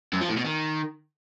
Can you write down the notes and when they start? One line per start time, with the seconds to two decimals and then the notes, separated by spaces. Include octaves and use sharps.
0.13 F#2
0.21 F3
0.29 A2
0.37 B2
0.45 D#3